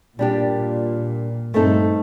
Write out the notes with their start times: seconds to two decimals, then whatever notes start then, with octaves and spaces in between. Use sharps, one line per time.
0.18 A#2 G3 D4 G4
1.54 G2 A3 C4 D#4 A4